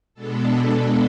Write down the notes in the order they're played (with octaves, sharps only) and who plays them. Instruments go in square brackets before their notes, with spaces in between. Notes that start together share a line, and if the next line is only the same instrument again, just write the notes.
[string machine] B2 G#3 B3 D4 A4